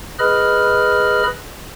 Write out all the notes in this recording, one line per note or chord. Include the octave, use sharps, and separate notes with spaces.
G#4 B4 D#5 B5 F6